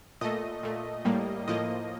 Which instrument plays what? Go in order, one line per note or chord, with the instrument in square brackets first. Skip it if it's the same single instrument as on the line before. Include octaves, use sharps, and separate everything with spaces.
[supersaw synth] A#2 A3 D#5
A#2 A3
A2 G3 A#3
A2 F3 A#3 D#5